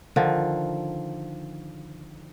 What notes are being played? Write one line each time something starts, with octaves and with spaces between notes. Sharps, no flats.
D3 D#3 F3